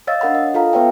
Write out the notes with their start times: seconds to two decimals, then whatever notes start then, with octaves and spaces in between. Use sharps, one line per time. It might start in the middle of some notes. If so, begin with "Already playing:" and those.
0.07 C#5 D#5 F5 E6 A6
0.21 D4 A#4 F#5 B5
0.35 D#5
0.54 F4 A4 F5 A#5
0.73 B3 B4 C#5 E5 G5